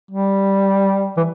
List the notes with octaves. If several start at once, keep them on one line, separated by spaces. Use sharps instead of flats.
G3
E3